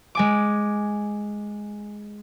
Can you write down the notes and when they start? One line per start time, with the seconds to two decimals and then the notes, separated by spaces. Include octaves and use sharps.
0.15 G#3 G#5 D6